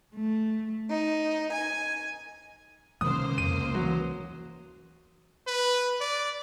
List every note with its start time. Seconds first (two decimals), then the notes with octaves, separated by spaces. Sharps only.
0.14 A3
0.89 D#4
1.52 G#5
3.01 C#2 C3 D#3 A#3 C4 C5 D#6
3.38 F2 D#7
3.75 E3 F#3
5.47 B4
6.00 D5